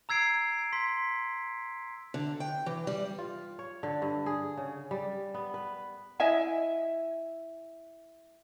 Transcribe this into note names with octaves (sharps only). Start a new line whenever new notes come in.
A#5 E6 G#6 C7 D7
C6 B6
D3
G5
E3
G3
F4
C#5
D3
G2
G#4
C#3
G3
B3
B4
E4 D#5 E5 G#5